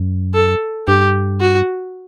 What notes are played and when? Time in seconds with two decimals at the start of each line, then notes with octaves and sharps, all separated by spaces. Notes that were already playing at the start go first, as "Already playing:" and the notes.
Already playing: F#2
0.34 A4
0.87 G2 G4
1.40 F#4